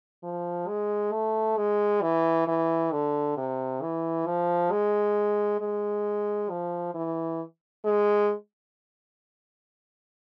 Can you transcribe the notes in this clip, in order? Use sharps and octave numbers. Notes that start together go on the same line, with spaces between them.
F3
G#3
A3
G#3
E3
E3
D3
C3
E3
F3
G#3
G#3
F3
E3
G#3